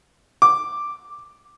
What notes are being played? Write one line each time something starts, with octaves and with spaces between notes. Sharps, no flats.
D6